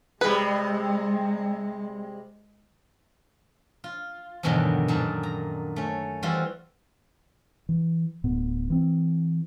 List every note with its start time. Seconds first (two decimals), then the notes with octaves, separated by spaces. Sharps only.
0.21 C3 G3 G#3 G#4 B4
3.84 F4
4.43 E2 G2 B2 D3 D#3 F#3
4.88 F#2 A#2 D#3 D4
5.23 A#5
5.76 A3 C#4
6.23 E3 G3 F4 F#4 C5
7.69 E3
8.24 D1 A2 B3
8.70 E3 C4